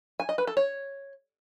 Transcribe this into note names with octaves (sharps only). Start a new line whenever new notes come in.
G#5
D#5
B4
A4
C#5